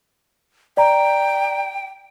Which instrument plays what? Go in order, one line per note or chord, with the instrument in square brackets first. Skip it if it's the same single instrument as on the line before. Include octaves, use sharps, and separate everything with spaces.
[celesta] D5 A#5 [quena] G5